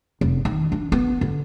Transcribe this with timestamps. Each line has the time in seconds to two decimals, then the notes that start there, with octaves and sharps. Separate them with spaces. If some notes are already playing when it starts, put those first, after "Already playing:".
0.21 F1
0.45 D#3
0.72 D4
0.92 B3
1.21 D3